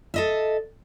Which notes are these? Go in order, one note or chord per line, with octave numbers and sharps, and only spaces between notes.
A4 D#5 E5